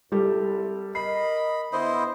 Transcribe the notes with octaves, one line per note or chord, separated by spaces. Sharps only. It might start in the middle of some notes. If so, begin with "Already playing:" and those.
C2 G3 G4 A4
A#4 D#5 B5 C7
D3 B3 E4 C5 D#5